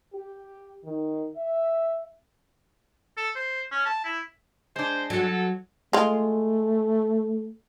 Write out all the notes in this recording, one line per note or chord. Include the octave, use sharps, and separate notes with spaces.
G4
D#3
E5
A4
C5
C#4
A5
E4
G#3 D4 C5
F#3 A4
G#3 A3 F4